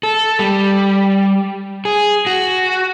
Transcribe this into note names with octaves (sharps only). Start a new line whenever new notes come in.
A4
G3
G#4
F#4